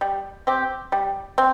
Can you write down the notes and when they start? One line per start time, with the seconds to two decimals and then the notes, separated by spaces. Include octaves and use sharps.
0.01 G3
0.47 C4 G4
0.92 G3
1.38 C4